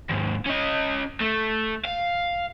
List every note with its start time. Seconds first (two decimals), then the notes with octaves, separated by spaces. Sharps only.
0.10 D#2 G#2
0.47 C#4 D#5
1.20 A3
1.85 F5